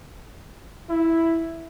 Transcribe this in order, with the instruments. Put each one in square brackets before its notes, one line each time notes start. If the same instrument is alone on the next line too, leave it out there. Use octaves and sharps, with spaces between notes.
[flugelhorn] E4